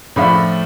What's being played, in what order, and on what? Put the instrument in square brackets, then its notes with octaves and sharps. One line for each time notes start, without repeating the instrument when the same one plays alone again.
[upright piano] A2 F3 A3 D4 F4 B5